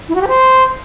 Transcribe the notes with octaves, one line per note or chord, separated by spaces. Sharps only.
E4
F#4
G4
C5